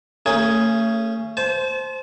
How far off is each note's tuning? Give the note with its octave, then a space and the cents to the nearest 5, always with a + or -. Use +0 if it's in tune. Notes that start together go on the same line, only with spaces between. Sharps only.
A3 +40 C#4 +0 G#4 +5
C5 +0 A5 -40